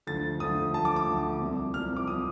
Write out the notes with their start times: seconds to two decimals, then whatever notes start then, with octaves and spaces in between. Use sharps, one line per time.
0.07 D2 D3 F3 A6
0.40 D2 D3 F3 D#6
0.74 D2 D3 F3 A5
0.85 D6
0.96 D6
1.07 D2 D3 F3
1.41 C2 C3 F3
1.74 C2 C3 F3 F6
1.97 D6
2.08 C3 F3 D#6